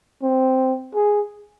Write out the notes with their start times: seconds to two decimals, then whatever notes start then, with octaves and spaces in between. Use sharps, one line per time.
0.22 C4
0.95 G#4